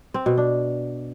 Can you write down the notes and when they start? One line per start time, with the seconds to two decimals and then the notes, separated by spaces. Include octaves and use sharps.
0.14 C4
0.26 B2
0.38 D4